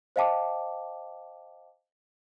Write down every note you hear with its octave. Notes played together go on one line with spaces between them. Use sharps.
C5 D#5 F5 G5 A5 D6